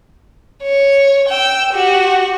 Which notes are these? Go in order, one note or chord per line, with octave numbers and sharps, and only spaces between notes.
C#5
G5 E6
F#4 G4